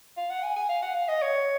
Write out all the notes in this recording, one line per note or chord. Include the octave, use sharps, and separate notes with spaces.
F5
F#5
G#5
G#5
F5
F#5
F5
D#5
C#5